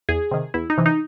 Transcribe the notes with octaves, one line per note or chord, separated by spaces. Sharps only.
E2 G#4
C3 D#3
E2 E4
D#4
C3 E3
D#4